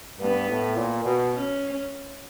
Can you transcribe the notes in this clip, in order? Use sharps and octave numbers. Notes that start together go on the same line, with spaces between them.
G2 B3
A2
A#2
B2
C#4